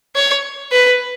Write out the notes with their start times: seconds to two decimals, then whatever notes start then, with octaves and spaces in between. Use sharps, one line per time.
0.15 C#5
0.71 B4